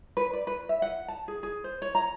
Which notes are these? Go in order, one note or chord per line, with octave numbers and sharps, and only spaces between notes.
B4
D5
B4
E5
F#5
A5
G#4
G#4
C5
C#5
A#5